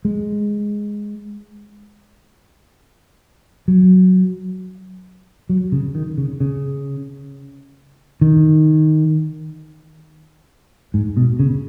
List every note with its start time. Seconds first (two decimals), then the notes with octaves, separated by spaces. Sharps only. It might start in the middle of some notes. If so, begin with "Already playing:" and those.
0.05 G#3
3.68 F#3
5.49 F#3
5.72 C#3
5.95 D#3
6.18 C#3
6.40 C#3
8.21 D#3
10.94 G#2
11.17 B2
11.39 C#3